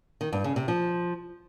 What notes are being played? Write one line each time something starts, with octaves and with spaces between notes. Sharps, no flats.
D#3
G2
C#3
C3
F3